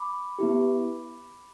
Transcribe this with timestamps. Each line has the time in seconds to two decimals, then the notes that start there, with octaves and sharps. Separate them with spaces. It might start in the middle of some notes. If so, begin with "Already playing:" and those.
Already playing: B5 D6
0.39 B3 E4 G4